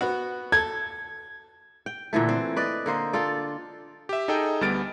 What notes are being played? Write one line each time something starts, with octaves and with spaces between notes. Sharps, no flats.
B3 F#4
A4 G#6
G5
A#2 D3 E3 A3
C4
B4 D5 D#5
D3 A#3 C5 D#5
F4 A4 D5
G4 E5
D#4 G#4 A4 D#5 G5
D2 G3 B3 F6 A6 D7